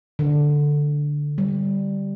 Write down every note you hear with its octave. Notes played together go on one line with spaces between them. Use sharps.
D3
G3